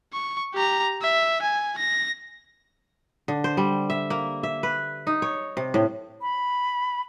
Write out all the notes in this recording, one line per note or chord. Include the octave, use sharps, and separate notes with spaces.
C#6
G4 A#5
E5
G#5
A#6
D3
C5
G3
E5
A#3
E5
B4
D#4
C#5
C3
A2
B5